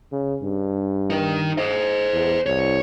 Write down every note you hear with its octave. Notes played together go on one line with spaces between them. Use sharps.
C#3
G2
D#4 A#4
C5 D#5
E2
C2 C#5